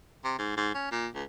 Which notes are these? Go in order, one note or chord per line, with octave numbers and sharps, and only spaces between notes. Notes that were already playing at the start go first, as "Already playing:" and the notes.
C3
G#2
G#2
C#4
A#2
C#2